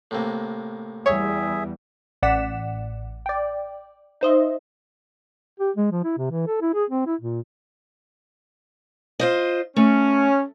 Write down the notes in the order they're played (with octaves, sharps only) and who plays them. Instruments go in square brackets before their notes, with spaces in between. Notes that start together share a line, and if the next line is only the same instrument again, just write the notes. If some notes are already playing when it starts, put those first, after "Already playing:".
[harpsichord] A2 C3 A#3
[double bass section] E2 G3 [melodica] G#4 E5 [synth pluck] C#5
[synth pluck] A1 D5 F#5 B6 E7
D5 G5
D#4 C5 D#5 E5
[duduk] G4
G#3
F3
E4
C3
E3
A4
E4
G#4
C4
E4
A#2
[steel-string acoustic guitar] F4 C5 D#5
[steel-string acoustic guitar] A3 [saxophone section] C#4